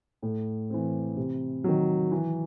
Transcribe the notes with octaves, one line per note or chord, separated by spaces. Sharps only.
A2
E3 C4
C3
D#3 F#3
E3